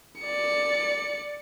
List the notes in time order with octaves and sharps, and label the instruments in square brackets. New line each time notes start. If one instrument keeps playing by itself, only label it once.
[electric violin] D5 C#7